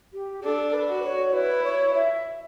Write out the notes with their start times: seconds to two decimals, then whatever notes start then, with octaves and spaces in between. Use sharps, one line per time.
0.13 G4
0.44 D4 A4
0.74 B4
0.89 F#4
1.04 C#5
1.34 E4 B4
1.64 C#5
1.94 E5